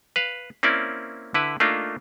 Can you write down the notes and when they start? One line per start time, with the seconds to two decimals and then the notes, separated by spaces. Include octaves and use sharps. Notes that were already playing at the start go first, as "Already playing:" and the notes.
0.16 B4 F5
0.63 A#3 C4 C#4 E4 D5
1.34 D3 E4 B4
1.60 A3 A#3 D4 D#4 F4